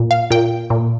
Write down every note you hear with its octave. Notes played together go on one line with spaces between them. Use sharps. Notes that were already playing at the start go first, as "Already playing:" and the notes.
Already playing: A#2
F5
A#2 G5
A#2